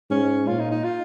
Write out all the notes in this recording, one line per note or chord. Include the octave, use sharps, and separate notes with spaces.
G#2 C#4
A#2 F4
D#4
D#4
F4